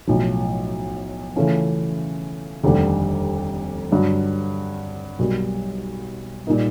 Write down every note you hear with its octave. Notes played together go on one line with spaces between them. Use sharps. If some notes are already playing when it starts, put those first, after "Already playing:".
B1 A2 F3
C#3 E3 A3 C#4 F4
F1 D#2 D3 G3
G2 D3 F#3
B1 B2 G3 A#3
A#2 G3 A#3 D#4